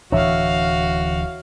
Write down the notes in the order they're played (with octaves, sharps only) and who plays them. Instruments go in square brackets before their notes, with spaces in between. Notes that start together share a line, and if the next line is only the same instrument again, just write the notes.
[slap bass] D1 E3 D4 [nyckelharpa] F#4 F5 [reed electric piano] C#5 E5